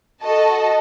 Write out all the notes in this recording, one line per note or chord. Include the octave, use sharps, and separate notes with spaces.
F#4 A4 D#5 A5